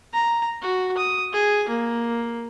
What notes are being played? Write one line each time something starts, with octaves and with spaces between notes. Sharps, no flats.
A#5
F#4
D#6
G#4
A#3